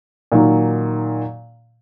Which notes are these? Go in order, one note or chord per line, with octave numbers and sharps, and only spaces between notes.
A#2 D#3 F#3